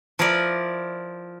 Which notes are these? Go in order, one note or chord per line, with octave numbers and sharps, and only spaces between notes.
F3 E4 F4 A#4 D5